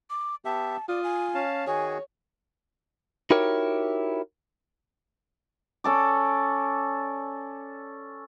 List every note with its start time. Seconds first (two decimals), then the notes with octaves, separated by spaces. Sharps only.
0.10 D6
0.45 B3 G4 E5 A5
0.89 F4 D5 D#6
1.04 G#5
1.34 C#4 F5 A5
1.67 D#3 F#4 G#4 C#5 G#5
3.31 D#4 E4 F#4 G4 A#4 C#5
5.84 C#4 A4 D5